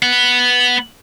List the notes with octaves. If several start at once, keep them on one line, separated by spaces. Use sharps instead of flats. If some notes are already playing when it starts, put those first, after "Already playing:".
B3 F#5